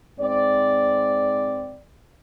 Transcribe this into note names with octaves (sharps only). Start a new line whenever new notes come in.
G#2 C4 D5